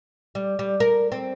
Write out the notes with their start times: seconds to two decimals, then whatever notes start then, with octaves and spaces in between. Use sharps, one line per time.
0.35 G3
0.59 G3
0.80 A#4
1.12 C4